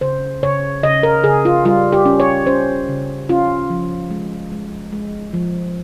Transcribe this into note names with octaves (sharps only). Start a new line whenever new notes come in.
C#3 C5
C#3 C#5
C#3 D#5
A#4
C#3 G#4
F4
G3 F4
G4
C#4
C#5
C#4 C5
C#3
C#4 F4
F3
G#3
G#3
G#3
F3